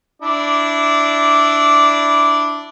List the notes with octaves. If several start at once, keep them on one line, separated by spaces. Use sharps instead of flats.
D4 E4 D5